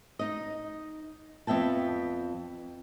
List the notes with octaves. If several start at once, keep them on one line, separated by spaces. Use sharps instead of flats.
D#4 D#5
F2 B3 E5 G5 A5